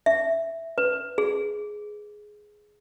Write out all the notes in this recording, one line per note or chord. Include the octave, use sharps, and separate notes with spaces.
E5
B4
G#4